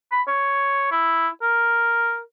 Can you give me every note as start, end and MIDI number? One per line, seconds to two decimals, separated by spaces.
0.12 0.22 83
0.28 0.89 73
0.92 1.28 64
1.42 2.20 70